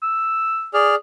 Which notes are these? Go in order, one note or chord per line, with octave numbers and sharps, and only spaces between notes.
E6
G#4 D5 F6